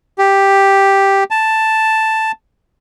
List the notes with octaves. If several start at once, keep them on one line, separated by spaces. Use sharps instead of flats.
G4
A5